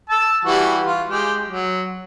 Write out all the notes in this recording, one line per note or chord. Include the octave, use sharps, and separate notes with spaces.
A5 E6
E3 G3 F#4
F4
G#3 G4
F#3